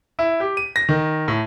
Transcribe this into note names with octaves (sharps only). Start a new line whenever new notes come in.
E4
G4
D#7
A#6
D#3
A2